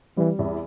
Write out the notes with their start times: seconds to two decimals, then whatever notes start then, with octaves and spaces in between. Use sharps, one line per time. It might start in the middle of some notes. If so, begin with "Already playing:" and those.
0.17 E3 G3
0.39 E2